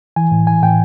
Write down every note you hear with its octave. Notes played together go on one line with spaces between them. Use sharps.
E3 G#5
A2
E3 G#5
A2 G5